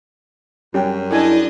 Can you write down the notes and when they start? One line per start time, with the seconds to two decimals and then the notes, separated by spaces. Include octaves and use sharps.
0.74 F#2 G3 C#4 G4
1.11 D4 E4 G#4 A4 D#5 G#5